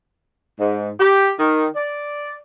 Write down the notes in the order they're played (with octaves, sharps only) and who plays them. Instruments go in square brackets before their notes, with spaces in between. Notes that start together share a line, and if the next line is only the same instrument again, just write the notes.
[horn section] G#2
G4
D#3
D5